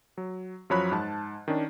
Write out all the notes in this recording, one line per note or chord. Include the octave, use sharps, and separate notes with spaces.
F#3
F#2 F3 F#3 C#5 B5 F#6
G#2 A5
D#3 C#4 D4